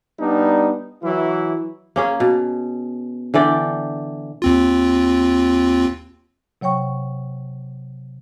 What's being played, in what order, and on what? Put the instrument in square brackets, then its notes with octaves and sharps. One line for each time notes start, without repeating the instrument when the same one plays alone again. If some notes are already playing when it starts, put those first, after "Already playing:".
[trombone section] G3 B3 D4 D#4
E3 F#3 E4
[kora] A#3 C#4 G#4
B2
D3 E3 D5 G5
[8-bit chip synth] D#2 C4 F4
[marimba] C3 F#3 C#5 G5 C#6